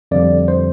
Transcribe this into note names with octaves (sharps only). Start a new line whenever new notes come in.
F2 D3 G3 D5
C5